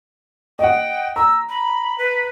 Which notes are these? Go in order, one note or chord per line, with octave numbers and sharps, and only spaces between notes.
D#5 F#5 G5
A#5 E6
B5
B4